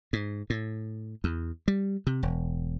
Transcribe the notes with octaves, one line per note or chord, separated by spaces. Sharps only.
G#2
A2
E2
G3
C3
E1